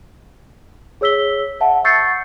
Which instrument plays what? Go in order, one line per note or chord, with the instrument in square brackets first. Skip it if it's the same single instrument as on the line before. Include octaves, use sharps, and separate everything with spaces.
[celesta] G#4 C#5 E6 B6 G7
E5 F#5 A5
C#6 E6 G6 A6 C7 C#7